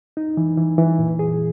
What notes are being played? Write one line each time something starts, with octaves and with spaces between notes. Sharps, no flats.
D#4
E3
E3
E3
A#2
G#4